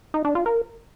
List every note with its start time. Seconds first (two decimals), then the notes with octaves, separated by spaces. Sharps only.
0.14 D#4
0.25 D4
0.35 F4
0.46 A#4